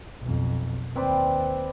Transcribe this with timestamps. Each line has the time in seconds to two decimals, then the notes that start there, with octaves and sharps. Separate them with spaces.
0.21 B1 F2
0.96 D#2 C4 B4 D5